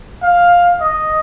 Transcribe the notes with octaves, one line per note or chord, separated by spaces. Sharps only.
F5
D#5